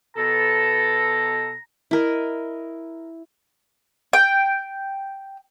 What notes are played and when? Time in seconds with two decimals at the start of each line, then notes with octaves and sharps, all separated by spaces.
0.17 B2 A4 A#5
1.91 E4 A#4 D#5
4.13 G5